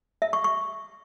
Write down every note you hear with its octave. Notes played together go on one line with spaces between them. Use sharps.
E5
C#6
C#6